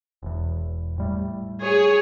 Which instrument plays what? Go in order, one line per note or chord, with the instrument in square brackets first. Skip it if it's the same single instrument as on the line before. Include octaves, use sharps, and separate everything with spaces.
[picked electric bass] E1 E2
A2 G3 A3
[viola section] G#4 C#5